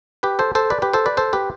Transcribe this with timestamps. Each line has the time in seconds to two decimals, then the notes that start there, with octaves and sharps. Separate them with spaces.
0.23 G4 B4
0.39 A4 C5
0.55 A4 C5
0.70 B4 D5
0.82 G4 B4
0.93 A4 C5
1.06 B4 D5
1.17 A4 C5
1.33 G4 B4